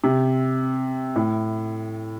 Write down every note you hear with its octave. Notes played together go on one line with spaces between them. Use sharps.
C3
A2